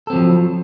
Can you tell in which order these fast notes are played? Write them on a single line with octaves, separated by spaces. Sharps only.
A4 C4 F#3 F3